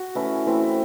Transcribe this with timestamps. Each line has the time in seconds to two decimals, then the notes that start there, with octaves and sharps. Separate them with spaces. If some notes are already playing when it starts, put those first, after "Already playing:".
Already playing: F#4
0.15 E3 A3 C#4 E4
0.46 E3 A3 C4 E4